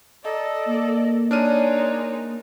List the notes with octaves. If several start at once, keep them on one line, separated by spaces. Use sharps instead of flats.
A4 D5 D#5 A#5
A#3
G#3 D4 D#4 C#5 F6 D#7